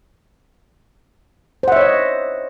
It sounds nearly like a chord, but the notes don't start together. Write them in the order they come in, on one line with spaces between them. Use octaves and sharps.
C5 F#5 E5 C#5 D#5